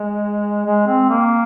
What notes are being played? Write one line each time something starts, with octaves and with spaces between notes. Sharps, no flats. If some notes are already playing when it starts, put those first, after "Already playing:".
Already playing: G#3
G#3
C4
A#3